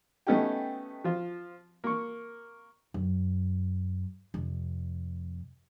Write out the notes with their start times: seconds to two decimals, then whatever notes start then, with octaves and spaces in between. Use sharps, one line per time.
0.27 A3 B3 C#4 D#4 G4 G5
1.04 F3 F4
1.84 A#3 C#6
2.94 F#2
4.34 F2 C3